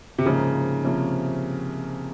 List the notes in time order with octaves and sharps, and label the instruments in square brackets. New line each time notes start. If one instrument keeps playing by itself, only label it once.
[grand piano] C3
[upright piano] G#2 F3 A#3 D#4 [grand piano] C#3
[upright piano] C3 F3 A#3 C#4